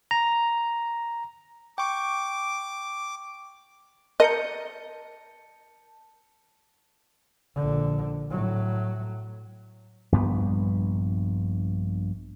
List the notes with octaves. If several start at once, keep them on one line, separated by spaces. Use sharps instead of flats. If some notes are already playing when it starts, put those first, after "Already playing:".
A#5
G5 C#6 D6
A#4 D#5 A5 G6 C#7
A#1 D3
A2 F#3
A#1 G2 B3